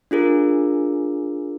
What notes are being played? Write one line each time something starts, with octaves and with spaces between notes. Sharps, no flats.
D4 F4 G#4 A#4